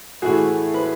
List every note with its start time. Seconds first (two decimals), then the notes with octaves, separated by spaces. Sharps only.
0.22 A2 E3 A3 E4 F#4 G#4
0.74 B4